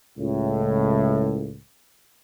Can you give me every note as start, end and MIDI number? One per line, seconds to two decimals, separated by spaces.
0.18 1.57 37
0.18 1.57 45